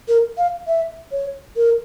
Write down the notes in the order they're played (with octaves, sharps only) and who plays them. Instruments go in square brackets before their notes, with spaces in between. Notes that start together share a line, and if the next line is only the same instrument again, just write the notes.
[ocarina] A#4
F5
E5
C#5
A#4